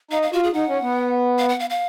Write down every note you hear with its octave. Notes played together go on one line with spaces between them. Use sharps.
D#4 F5
F5
F4 F#4
G#4
D#4 F#5
C#4
B3
F5
F#5
F5
F5